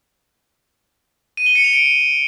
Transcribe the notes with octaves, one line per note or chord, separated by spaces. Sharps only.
D#7
G7
C#7
F7
D7